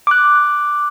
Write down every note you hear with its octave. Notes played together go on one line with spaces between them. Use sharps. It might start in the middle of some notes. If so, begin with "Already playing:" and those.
D6 F#6